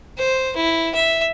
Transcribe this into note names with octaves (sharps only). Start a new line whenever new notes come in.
C5
E4
E5